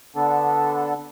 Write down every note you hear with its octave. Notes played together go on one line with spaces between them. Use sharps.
D3 B3 D4 A4